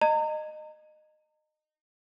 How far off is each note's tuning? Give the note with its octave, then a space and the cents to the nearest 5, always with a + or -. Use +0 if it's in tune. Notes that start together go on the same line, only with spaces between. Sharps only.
D#5 -20 A#5 -35